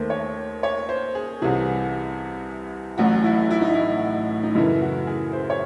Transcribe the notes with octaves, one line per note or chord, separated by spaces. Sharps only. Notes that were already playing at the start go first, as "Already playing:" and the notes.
Already playing: D#2 D#3 A3 C5
C#5
C#5
C5
G#4
C2 C3 E3 G#4
A1 A2 F#3 F#4
E4
E4
D#4
E4
D#4
F#2 C#3 E3 A3 E4
F#4
G#4
C5
C#5